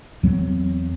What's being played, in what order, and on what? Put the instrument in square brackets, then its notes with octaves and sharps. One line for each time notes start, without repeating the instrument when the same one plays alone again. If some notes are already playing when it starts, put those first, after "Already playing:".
[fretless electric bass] E2 F#3 C4